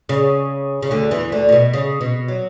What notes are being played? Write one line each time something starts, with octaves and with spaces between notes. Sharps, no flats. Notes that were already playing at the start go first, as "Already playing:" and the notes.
C#3
C#3
D2 D3
E2 E3
D2 D3
A2
B2
C#3
B2
F#3